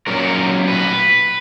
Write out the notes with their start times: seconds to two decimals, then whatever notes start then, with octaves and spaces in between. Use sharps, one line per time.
0.07 A#2 F#3 C#4 A#4
0.68 B4